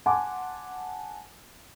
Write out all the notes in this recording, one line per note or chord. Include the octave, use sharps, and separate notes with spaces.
F#5 G#5 A5 C6 D6